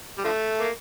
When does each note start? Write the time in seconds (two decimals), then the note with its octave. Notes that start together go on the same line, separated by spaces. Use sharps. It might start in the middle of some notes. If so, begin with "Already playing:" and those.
0.18 G3
0.24 D3 F3 A3
0.59 A#3